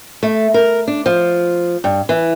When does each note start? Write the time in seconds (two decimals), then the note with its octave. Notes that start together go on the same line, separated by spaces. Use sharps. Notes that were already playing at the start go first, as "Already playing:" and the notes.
0.23 A3
0.54 A#4
0.88 D4
1.06 F3
1.84 G2
2.09 E3